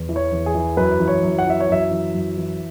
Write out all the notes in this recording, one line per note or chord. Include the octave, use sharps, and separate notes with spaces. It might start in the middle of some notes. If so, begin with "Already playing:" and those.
Already playing: E2
E3
C#5
E2
G#4
E3
F#2 B4
E3
C#5
F#2
F#5
E3 E5
C#5
F#2 E5
E3
F#2
E3